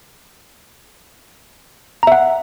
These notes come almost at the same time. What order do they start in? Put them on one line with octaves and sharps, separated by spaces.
A#5 E5 F#5